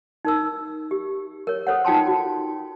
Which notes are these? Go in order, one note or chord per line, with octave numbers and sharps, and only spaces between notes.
D#4 A#4 E6
G4
A#4 C#5
A4 C5 C#5 F#5
D#4 F4 G5 A5 C6
F#4